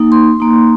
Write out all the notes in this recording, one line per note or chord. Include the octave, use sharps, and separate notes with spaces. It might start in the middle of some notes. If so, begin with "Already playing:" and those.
Already playing: A#3 D#4
C6
A#3 D#4